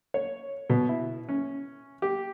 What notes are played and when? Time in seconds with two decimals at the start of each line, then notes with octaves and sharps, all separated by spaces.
0.14 C#5
0.70 B2
0.89 E4
1.29 C#4
2.02 G4